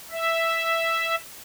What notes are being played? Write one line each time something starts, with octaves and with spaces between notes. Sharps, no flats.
E5